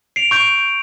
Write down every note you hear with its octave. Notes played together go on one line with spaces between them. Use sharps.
C7 D7 F7
C#6 G6 D7